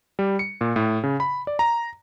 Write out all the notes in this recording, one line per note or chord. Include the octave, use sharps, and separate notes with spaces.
G3
C#7
A#2
A2
C#3
B5
D5
A#5